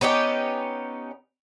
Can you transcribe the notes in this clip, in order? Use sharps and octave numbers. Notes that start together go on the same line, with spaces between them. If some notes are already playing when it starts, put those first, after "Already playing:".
B3 C#4 D#4 G4